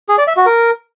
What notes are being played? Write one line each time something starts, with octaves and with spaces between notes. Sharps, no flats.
G#4
D5
E5
F#4
A#4